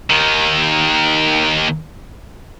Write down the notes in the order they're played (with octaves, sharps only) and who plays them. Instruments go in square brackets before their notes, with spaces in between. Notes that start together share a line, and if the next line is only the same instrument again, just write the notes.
[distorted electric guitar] D#2 D#3